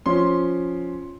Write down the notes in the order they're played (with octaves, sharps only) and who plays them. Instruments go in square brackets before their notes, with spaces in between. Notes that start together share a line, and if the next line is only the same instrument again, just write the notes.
[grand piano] F3 C#4 C6